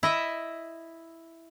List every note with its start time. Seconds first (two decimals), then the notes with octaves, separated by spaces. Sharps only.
0.03 E4 D#5 E5